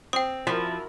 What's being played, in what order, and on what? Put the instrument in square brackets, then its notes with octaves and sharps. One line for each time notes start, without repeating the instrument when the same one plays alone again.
[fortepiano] C4 [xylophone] G5 D#6
[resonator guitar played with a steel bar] F3 [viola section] E4 F#4 A#4